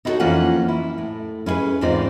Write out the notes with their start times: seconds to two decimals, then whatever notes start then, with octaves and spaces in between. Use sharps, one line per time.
0.05 D#4 E4 F#4 G4 A4 C#5
0.20 F2 E3 A#3 C#4 F4 F#5
0.68 E4
0.98 A2
1.46 C#4 E4 F#4 G#4 B4
1.81 E2 G#2 C4 D#4 F4 D5